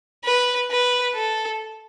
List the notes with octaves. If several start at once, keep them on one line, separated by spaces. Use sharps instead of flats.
B4
B4
A4